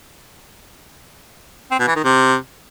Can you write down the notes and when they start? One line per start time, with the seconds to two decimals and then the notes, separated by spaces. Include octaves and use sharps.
1.71 C4
1.80 B2
1.88 E3
1.96 D#3
2.04 C3